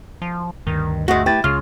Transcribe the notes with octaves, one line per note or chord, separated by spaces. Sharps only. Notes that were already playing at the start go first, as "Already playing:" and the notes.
F3
D2 G2 D#3
G#3 A3 F#4
E4 G4 B4 G5 A6
C#2 C#3 F4 F6